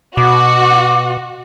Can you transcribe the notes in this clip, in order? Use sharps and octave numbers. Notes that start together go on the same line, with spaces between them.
B2 F#4 D6